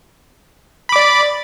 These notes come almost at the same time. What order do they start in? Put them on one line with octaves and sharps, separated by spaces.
B5 D6 D5